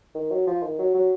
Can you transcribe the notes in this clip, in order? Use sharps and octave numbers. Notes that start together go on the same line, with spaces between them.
D#3
F#3
F3
D#3
F#3
F#3